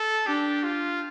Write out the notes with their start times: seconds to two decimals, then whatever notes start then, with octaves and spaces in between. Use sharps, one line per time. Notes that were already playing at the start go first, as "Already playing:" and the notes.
Already playing: A4
0.26 D4 G4
0.63 F4